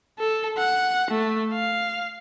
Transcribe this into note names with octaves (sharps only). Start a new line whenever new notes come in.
A4
F#5
A3
F5